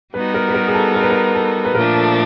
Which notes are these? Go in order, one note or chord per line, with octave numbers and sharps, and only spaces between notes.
G3 B3 D#4 F#4 B4
A#4
B4
A#4
G#4
A4
A#4
B4
A#4
A4
B4
A#2 F3 A3 D4 A#4
A4